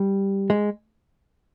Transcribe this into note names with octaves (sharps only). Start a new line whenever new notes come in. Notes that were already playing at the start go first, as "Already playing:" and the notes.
Already playing: G3
G#3